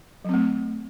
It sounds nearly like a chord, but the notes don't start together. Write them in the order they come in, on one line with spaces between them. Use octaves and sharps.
F#3 C4 A3